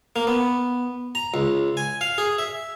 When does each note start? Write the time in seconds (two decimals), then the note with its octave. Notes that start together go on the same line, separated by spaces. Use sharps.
0.16 A#3
0.27 B3
1.15 A#5
1.34 C#2
1.77 G#5
2.01 F5
2.18 G#4
2.38 E5